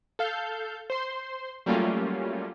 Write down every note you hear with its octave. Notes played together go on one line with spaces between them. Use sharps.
A4 F5 G6
C5 C6
F#3 G3 A3 A#3 C#4 F4